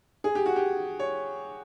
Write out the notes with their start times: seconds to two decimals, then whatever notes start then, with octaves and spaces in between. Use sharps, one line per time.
0.24 G#4
0.35 G4
0.46 F#4
0.56 G4
0.99 C#5